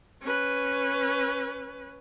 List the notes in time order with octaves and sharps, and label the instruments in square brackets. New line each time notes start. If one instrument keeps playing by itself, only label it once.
[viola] C#4 B4